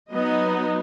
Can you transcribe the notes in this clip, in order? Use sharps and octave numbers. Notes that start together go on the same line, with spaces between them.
F#3 B3 D#4 D#5